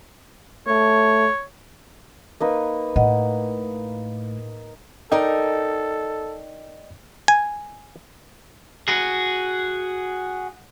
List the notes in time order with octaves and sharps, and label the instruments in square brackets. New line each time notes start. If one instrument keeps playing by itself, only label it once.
[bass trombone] A3 [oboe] C#5
[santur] A#3 D#4 B4
[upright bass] A2 [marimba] D#5 F#5
[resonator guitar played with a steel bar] D#4 A#4 [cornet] A4 [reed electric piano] D5 D#5 G5
[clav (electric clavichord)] G#5
[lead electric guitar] F#4 G#4